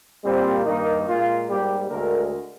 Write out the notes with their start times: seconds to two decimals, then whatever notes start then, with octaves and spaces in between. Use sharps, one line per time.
0.24 A#2 G3 A#3 C4
0.65 G2 D#3 A#3 D#4
1.07 A#2 G#3 F4
1.48 G#2 G3 A#3 G4
1.89 D2 D3 G#3 A#4